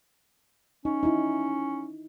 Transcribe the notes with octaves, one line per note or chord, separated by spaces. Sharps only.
C#4 D#4
D#4 E4